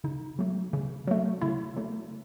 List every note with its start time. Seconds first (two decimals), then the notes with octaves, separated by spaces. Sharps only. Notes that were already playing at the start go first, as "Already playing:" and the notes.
0.04 C#3 D#4
0.39 F#3 A3
0.73 C#3
1.08 F#3 A3
1.42 C#3 E4
1.76 F#3 A3